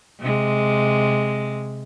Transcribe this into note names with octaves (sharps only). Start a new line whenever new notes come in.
C3 G#3